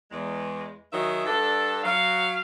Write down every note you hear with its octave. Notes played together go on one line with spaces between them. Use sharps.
E2 G#3
D#3 F#3 G#4 D#5 E5
G2 D4 A4
F#3 F5